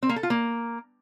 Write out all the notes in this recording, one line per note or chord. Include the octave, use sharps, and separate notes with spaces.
C4
A#3
A4
F4
A#3